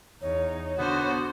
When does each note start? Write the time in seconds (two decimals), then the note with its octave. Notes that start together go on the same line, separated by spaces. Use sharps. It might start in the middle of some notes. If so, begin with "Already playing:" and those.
0.22 E2 D#4 C#5
0.78 D3 B3 F#4 C5